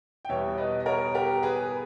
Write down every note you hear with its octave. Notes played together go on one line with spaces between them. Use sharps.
G5
E2 B2 G3 C#5 E5
B4 D#5
D#5
A#4 C#5
G4 A#4
G#4 B4